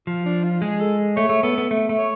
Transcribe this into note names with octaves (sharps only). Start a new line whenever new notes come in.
F3 F4
D4
F4
G#3 G#4
A4
A3 C#5
A3
B3 A4
B3
A3
A3
C#5